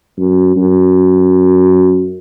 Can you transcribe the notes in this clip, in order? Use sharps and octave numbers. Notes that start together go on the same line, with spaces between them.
F#2
F#2